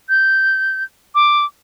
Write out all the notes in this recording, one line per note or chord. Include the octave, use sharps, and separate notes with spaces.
G6
D6